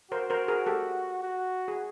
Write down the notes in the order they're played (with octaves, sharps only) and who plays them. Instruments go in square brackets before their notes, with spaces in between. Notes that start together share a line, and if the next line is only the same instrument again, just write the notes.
[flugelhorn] F#4 [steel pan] A#4 C5
[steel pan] A#4 C5
G#4 A#4
G4 A4
[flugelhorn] F#4
[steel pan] G#4